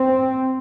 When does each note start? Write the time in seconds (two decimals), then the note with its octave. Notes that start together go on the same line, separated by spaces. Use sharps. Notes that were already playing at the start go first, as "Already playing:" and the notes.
Already playing: C4